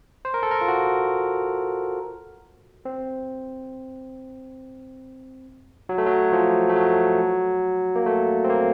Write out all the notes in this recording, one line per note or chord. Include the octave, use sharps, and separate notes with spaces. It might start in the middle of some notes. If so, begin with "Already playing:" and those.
C5
A#4
A4
A#4
F4
F#4
C4
F#3
A3
F#3
F3
A3
F#3
A#3
A3
C4
A#3